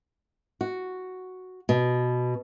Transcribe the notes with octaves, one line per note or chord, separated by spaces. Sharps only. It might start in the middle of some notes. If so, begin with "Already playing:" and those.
F#4
B2